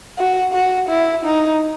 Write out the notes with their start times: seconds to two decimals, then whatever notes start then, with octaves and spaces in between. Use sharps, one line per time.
0.18 F#4
0.53 F#4
0.89 E4
1.25 D#4